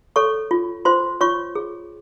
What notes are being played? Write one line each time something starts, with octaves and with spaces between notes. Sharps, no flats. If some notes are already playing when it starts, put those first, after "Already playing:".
A4 C#5 C#6
F4
F4 C5 C6
F4 C#5 C#6
G#4